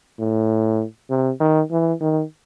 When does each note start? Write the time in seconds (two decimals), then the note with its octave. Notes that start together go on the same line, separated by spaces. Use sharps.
0.19 A2
1.10 C3
1.40 D#3
1.71 E3
2.01 D#3